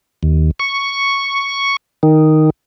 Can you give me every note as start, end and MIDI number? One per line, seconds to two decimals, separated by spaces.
0.23 0.51 39
0.60 1.77 85
2.03 2.50 51